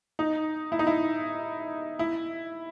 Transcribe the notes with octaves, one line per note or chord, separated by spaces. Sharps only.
D#4
E4
D#4
E4
E4